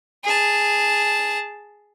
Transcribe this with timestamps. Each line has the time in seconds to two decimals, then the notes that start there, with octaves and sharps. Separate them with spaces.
0.24 G#4 A5